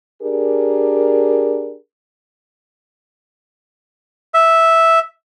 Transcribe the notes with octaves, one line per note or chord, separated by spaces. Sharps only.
D4 G4 G#4 A#4
E5